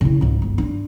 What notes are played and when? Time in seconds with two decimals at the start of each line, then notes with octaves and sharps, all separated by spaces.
0.01 C#3 E4
0.21 C#2 G#2
0.42 G1
0.58 D4